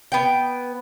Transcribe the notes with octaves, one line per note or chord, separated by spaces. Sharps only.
B3 G5